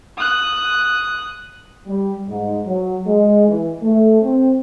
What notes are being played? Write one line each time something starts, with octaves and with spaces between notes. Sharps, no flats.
D#6 F#6
G3
G#2
F#3
G#3
E3
A3
C4